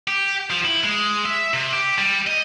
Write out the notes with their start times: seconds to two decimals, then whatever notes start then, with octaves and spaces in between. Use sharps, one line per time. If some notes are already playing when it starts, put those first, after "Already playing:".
0.08 G4
0.51 F3
0.65 E4
0.84 G#3
1.26 E5
1.54 C3
1.73 G4
1.98 G3
2.27 D#5